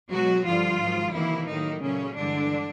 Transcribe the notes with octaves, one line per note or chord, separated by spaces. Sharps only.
B2 F#3 G#3 F#4
G2 D3 F3 G3 F4
G#2 D#3 F#3
C3 D#3 E3 F#3 A#3 E4
A2 D#3 F#3 A#3 D#4
A#2 C#3 F#3 A3 C#4
G2 D3 E3 G#3 D4